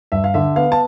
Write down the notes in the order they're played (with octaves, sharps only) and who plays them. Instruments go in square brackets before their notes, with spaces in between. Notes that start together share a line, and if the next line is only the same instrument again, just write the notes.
[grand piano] G2 [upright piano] E5
[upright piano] F5
[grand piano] D3 [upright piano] E5
[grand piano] B3 [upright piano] F5
[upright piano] A5